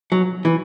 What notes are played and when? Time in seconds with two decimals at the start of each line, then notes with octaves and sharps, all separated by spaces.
0.12 F#3
0.45 E3